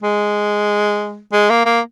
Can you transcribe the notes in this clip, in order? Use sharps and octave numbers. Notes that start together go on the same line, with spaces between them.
G#3
G#3
A#3
A#3